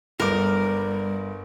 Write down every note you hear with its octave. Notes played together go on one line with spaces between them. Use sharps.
G1 G3 A#4 D6